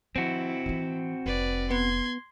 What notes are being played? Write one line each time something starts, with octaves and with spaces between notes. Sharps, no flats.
F3 C4 E4 F#4
E3 F4
F1 B4 D5
B3 C6 G#6